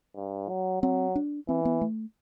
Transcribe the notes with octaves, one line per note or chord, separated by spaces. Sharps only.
G2
F#3
F#3 C4
D4
E3 C4
B3
A3